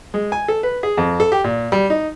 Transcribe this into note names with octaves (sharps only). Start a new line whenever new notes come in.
G#3
G#5
A4
B4
G#4
F2
A4
G4
A#2
G3
D#4